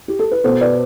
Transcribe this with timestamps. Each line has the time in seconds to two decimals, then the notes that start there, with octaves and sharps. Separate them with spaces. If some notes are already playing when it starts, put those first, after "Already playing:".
0.08 G4
0.19 A4
0.31 B4
0.44 B2 B3 A4 C5
0.61 B4 D5